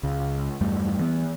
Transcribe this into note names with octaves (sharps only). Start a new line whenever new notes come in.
C#2 C#3
E2 G2 G3 A3
E3 B3